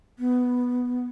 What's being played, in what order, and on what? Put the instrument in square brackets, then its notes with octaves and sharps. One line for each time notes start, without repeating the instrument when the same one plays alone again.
[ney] B3